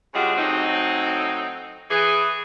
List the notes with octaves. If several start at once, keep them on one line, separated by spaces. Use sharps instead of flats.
C#3 G3 G#3 D4 F4 F#4
A2 F#3 C4 D#4
E3 G#4